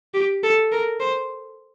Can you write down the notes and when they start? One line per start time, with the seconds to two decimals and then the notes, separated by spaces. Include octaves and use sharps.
0.14 G4
0.44 A4
0.72 A#4
1.01 C5